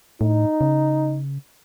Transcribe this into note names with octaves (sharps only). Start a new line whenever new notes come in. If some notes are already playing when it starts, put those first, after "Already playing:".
A2 D#4
C#3